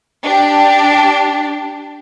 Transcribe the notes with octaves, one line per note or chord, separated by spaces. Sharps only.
D4 G4